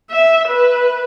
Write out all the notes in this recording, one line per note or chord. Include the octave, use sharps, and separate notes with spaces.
E5
B4